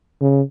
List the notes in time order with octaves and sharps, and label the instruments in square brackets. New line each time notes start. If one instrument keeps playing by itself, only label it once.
[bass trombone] C#3